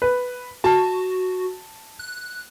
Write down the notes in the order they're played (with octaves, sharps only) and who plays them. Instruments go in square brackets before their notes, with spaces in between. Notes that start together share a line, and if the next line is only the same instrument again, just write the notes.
[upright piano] B4
[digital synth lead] F#4 [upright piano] A5
[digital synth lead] F#6